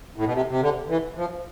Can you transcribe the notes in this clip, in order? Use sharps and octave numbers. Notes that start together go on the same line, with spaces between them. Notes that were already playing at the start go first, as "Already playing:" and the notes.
A2
B2
C3
C3
D3
E3
F3